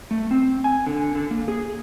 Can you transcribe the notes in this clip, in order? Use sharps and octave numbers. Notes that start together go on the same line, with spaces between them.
A3
C4
G#5
D3
D3
A#3
G#4